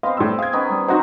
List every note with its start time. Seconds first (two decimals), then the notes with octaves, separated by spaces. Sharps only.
0.03 B3 C4 D#5 F5 C6
0.17 A2 G3 E6
0.39 G#4 F5 G5 G#6
0.53 D#3 B3 C#4 D#5
0.70 G3
0.88 F#3 C4 D#4 F#4 C5